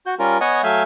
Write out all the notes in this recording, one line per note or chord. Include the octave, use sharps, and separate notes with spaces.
F#4 G6
G3 C#4 F4 A#4
B3 C#5 D#5 F#5 G#5
F#3 A3 E5 F5 G#5 G6